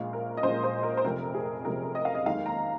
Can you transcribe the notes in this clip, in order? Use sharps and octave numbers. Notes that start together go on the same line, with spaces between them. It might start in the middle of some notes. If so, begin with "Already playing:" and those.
Already playing: A#1 A#2 G#3 F5
A#4
D#5
A#1 A#2 G#3 C5
C5
A#4
C5
F1 F2 C3 A#4
G#4
F1 F2 C3 A#4
D#5
F5
D#5
D#2 D#3 G#3 F5
A#5